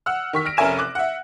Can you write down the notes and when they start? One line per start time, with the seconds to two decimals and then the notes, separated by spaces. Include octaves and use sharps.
0.06 F#5 E6 F6
0.33 D#3 C#6 B6
0.45 F6 A#6 D7
0.57 F1 C#4 A#4 E5 G#5 E7
0.78 D6 F#6
0.95 E5 F#5